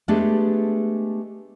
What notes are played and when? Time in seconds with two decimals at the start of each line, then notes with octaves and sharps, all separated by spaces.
0.08 G#3 A3 B3 D4 G4 G#4